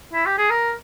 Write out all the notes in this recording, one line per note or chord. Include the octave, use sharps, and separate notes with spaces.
E4
G4
G#4
A#4